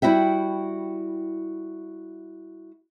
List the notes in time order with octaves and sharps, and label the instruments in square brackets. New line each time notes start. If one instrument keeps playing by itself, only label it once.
[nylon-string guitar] G3 E4 F#4 E5 G5